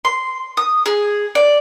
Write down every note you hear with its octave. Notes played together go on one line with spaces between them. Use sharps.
C6
D#6
G#4
D5